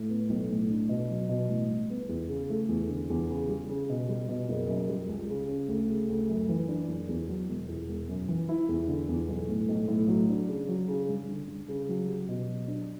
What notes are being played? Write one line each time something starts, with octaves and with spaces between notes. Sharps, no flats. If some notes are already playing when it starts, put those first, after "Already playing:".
Already playing: A2
B3
B1
A2
D4
B2
F#3
B2
A1
G2
B3
E2
C#3
A3
E2
D3
E2
C#3
G3
C#3
B2
G3
B2
F#1
F#2
G3
C#2
C#3
C#4
D2
C#3
D2
F#2
E3
D4
F#1
E2
F#3
E1
E2
E1
F#2
E3
E4
E2
D3
E2
B1
A2
B1
A2
F#3
D4
C#3
F#3
C#3
G2
D3
G2
C#3
F#3
G4
B2
F#3
D4